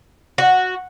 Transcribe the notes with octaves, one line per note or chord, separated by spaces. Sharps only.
F#4